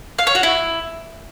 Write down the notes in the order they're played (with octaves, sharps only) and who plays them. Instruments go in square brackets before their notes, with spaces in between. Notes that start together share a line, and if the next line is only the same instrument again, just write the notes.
[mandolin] F5
C#5
F#4
E4